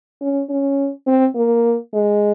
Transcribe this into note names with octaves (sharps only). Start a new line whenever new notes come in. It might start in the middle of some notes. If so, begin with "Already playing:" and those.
C#4
C#4
C4
A#3
G#3